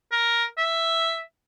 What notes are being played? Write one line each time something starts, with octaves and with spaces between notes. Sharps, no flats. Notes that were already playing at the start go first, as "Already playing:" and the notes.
A#4
E5